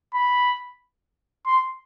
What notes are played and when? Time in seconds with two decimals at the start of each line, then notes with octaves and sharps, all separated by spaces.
0.14 B5
1.46 C6